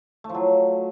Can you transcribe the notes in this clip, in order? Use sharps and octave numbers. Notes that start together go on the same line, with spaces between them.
A3
F3
F#3